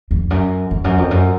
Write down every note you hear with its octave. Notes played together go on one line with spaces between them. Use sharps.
F2
F#2
F2
F#2
F2
F#2